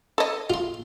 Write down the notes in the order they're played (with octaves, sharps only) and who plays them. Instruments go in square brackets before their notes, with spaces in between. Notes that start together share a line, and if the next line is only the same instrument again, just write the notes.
[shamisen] A4 D#5
[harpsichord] F4 C6